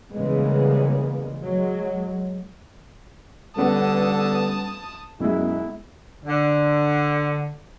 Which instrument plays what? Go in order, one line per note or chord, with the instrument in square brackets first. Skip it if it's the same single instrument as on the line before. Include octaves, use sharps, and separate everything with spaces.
[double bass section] C#3 E3 G3 G#3 A#3 B3
F#3 G#3
[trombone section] D3 A4 [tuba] G3 [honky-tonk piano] B3 C#4 [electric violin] A5 D#6
[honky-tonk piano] B1 G#3 [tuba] F#2 [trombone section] E4
[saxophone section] D3